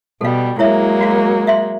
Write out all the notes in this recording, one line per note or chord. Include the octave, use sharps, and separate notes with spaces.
B2 G3 A4 F5
F#3 G#3 A#3 E4 C#5 E5
F#4 F5
E5 F5 C6